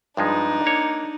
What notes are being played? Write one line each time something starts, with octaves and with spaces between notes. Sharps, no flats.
G2 F3 G#3 D4 D#4
A#3 C#5